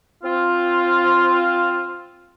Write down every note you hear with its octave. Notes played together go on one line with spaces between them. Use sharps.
C4 F4